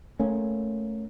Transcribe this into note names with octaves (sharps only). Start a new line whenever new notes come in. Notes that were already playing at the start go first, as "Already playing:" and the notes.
A3 A#3 C#4